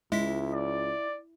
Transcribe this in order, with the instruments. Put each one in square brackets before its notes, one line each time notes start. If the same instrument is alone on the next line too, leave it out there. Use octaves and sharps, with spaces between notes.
[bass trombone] C#2 [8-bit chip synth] G#3 B6 [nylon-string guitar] E4
[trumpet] D5